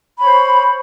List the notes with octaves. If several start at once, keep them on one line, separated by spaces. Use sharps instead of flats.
C5 C#5 B5